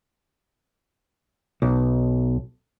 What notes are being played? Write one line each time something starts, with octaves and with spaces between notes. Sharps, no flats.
B1